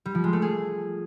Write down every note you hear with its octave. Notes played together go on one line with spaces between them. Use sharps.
G3
F3
G#3
A3
G#4